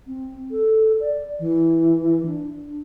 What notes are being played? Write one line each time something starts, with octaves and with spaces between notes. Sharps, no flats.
C4
A4
D5
E3
D4